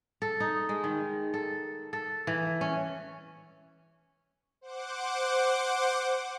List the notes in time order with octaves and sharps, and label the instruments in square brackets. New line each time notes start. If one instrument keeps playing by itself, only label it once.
[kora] A4
D#4
G#3
D#3
A4
A4
E3
C#4
[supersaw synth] C5 F#5 D6